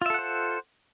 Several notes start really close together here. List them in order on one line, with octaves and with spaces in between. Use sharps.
F4 E5 A4 F#5 C5